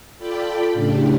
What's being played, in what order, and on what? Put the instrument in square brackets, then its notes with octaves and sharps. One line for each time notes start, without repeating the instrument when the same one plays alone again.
[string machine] F4 A4 D5 G5 B5
A2 C#3 D4 G4